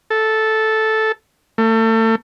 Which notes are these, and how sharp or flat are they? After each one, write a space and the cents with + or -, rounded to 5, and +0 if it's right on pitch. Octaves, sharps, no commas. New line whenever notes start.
A4 -5
A3 +35